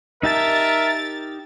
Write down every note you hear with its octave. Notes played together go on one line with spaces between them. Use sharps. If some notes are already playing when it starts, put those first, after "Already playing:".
D#4 G4 A#4 E5 A5 A6